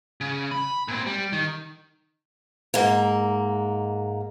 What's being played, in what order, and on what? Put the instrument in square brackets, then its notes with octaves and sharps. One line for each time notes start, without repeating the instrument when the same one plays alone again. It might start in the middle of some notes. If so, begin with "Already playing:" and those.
[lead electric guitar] C#3
B5
A#2 C4
G3
D#3
[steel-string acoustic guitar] G#2 A#3